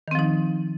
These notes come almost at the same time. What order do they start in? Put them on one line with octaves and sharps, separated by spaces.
D#3 C4 F3 D#4